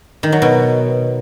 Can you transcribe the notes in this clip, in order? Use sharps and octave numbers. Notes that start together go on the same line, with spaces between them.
D#3
F#3
B2